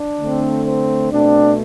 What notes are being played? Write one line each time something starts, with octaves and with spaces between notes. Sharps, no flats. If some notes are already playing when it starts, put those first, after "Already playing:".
Already playing: D4
D3 A3 C4
C4
B2 A3 C4 D4